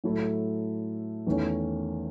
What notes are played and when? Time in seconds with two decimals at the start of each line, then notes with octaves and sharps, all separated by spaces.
0.04 A2 F#3 A3 E4 A4
1.27 E2 D#3 A3 C#4